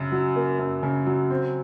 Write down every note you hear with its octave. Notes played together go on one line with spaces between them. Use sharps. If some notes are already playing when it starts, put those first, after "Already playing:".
Already playing: F#2 C#3
F#3
A#3
F#2
C#3
F#3
C4